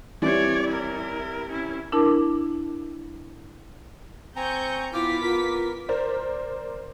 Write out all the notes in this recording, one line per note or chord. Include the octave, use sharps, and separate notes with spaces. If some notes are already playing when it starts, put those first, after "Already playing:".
E3 G3 C4 C#5 D5
E4 A#4
C#4 E4
D4 E4 A#4 A5 D6
C4 G#5 A#5 C#6 G6
B3 E4 F4 D6 F6 B6
F4 A#4
A#4 C5 D5